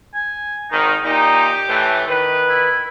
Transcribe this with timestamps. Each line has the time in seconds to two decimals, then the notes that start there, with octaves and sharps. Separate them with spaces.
0.14 G#5
0.71 G#1 D#3 D#4
1.04 A#2 D#4 G4
1.68 A2 E3 A3
2.08 D#3 B4
2.49 E4